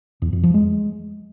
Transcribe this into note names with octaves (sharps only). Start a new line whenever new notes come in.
E2
F2
F3
G#3